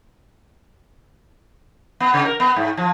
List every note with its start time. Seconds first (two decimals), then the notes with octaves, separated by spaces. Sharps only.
2.00 B3
2.14 C#3
2.25 A#4
2.40 B3
2.56 G#2
2.77 F3